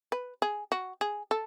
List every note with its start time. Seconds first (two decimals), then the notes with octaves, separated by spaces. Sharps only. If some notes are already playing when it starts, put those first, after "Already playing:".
0.12 B4
0.42 G#4
0.72 F#4
1.01 G#4
1.31 A4